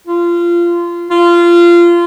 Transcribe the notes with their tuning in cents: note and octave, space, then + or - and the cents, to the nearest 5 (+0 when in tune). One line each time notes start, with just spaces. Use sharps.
F4 -20
F4 -20